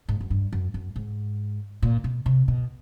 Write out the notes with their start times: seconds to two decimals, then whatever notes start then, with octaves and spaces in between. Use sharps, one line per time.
0.09 G#2
0.21 F#2
0.30 G2
0.53 F#2
0.74 F#2
0.96 G#2
1.82 A#2
2.04 B2
2.26 C3
2.48 B2